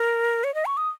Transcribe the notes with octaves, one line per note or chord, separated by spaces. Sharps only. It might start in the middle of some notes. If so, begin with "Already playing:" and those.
Already playing: A#4
C#5
D#5
C#6
D#6